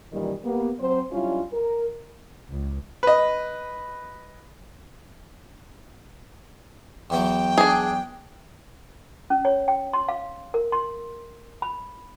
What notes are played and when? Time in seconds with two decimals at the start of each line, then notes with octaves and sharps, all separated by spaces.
0.12 F#2 A#2 D#3 E3 G3
0.44 A#3 B3 G4
0.79 F#3 C4 C5
1.11 F#3 G3 C#4 D4 E4 F4
1.53 A#4
2.50 C#2
3.03 B4 D#5
7.10 E2 E3 F#3 G5
7.58 D4 G#4
9.30 C#4
9.45 C#5
9.68 G5
9.93 C6
10.08 F5
10.54 A#4
10.72 C6
11.62 B5